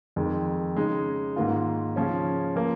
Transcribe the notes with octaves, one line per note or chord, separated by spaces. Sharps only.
F2 D#3 G#3
C#3 G#3 D#4
G#2 D#3 A#3 F4
C#3 F3 C#4
F3 A#3